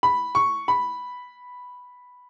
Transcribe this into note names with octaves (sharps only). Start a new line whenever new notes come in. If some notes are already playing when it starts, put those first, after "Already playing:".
B5
C#6
B5